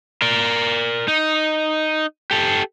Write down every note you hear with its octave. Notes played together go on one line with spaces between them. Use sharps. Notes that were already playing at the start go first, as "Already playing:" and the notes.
A#4 D5
D#4
G4 A4